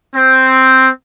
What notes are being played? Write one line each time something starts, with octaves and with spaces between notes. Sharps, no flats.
C4